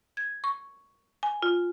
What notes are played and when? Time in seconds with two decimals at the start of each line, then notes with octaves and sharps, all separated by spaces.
0.17 G#6
0.44 C#6
1.23 G#5
1.42 F4